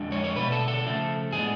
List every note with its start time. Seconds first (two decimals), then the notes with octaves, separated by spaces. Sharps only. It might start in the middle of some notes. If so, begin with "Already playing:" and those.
Already playing: F2 D3 G#3 D4
0.12 C#5
0.24 C#5
0.36 B2 A3 D4 B4
0.52 A4
0.68 A4
0.84 C#3 F3 A3
1.32 A2 G#3 B3 D4 G#4